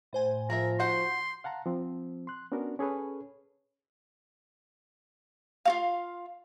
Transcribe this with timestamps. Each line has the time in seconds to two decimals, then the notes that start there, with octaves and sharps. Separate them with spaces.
0.13 A2 C5 G#5
0.50 F3 G#4 A#4 E5 A#5
0.80 D#4 F#4 F#5 C6 G6
1.44 F5 F#5 A5 A#5
1.66 F3 C4
2.27 C6 F#6
2.52 B3 C#4 D4 F#4 A#4
2.79 C#4 G#4 A4 B4 C#5
5.65 F4 F#4 F5